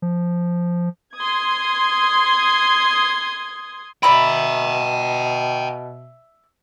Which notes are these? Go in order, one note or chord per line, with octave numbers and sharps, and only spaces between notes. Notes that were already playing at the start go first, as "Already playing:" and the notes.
F3
C6 D#6 G#6
B2 D5 E5 G5 A#5 B5